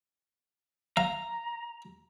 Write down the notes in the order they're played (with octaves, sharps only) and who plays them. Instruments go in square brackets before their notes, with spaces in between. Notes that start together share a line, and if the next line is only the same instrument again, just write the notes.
[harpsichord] F5 [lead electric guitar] A#5